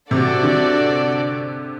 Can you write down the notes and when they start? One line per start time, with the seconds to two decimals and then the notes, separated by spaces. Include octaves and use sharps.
0.10 C3 D4 F#4 A4 D5
0.43 D3